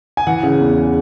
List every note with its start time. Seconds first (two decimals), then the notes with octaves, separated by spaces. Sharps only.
0.17 G#5
0.27 E3 F#5
0.43 C#3
0.60 E2